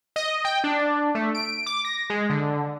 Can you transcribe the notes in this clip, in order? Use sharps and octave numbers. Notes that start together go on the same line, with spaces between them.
D#5
G5
D4
A3
D7
D6
A#6
G#3
D3